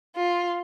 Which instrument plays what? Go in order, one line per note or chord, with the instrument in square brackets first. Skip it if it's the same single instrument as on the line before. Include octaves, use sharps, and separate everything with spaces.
[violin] F4